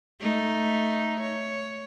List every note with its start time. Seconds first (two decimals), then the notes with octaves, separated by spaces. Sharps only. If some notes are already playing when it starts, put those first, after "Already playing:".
0.20 A3 D#4
1.21 C#5